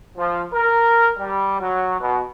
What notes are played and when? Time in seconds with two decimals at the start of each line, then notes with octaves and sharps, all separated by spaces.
0.18 F3
0.54 A#4
1.19 G3
1.60 F#3
2.01 B2